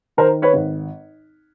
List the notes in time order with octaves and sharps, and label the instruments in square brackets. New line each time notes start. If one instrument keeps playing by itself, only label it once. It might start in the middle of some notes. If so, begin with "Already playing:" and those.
[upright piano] D#3 A#4 C5
B4 C#5
G#1